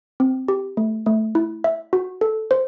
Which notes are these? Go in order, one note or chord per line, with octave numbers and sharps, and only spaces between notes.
C4
G4
A3
A3
E4
E5
F#4
A4
C5